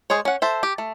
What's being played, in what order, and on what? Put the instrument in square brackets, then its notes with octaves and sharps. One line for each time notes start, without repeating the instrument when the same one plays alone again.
[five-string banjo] G#3 G#4 C5 C#5
C#4 F#5
A4 C5 E5
G4
A3